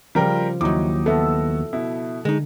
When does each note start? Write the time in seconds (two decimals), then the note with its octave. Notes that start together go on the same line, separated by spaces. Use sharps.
0.15 C#3 F3 G3 F4 A#4 G5
0.61 D#2 F#3 D#4 E4 D6
1.06 B3 F#4 A4 E5
1.73 B2 E4
2.25 D3 G#3 D#4